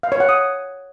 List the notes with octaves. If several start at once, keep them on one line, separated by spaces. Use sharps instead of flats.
F5
C#5
F#5
D#6